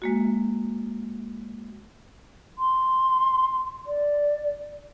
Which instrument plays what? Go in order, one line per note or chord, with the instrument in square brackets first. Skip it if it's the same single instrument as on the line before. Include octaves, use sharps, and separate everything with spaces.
[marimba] G#3 A#3 F#4
[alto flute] C6
D5